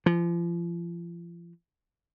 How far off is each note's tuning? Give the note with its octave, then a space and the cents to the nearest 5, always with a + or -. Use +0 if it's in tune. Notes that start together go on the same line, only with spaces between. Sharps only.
F3 -35